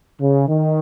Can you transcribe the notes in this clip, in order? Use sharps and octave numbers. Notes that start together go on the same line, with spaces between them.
C#3
D#3